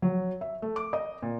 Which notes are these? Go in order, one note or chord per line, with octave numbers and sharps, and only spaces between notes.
F#3
E5
A3
D6
D#5
A#2